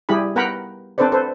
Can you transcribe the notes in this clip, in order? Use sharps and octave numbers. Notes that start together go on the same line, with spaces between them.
G3 E4 G4 G#4 B5
B3 A#4 F#5 G5 A#5 B5
C4 D4 A4 B4 C5 D5
A4 B4 C5